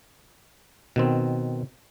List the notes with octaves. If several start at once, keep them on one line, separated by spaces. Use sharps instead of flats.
B2 D#3 C4